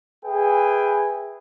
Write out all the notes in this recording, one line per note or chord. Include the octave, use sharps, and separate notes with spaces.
G#4 B4 E5 G5 G#5